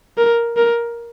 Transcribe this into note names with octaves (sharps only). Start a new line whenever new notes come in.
A#4
A#4